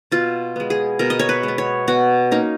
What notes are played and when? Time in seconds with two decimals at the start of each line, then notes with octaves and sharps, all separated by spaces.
0.11 B2 F4
0.56 G#3 B3
0.70 G#4
0.99 B2 A#4
1.10 D#5
1.19 C#5
1.29 B4
1.43 G#3 B3
1.58 C#5
1.88 B2 F#4
2.31 A#3 C#4 D#4